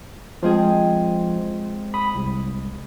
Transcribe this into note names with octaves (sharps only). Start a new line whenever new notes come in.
F3 G#3 C4 G#4
B5 D#6
C2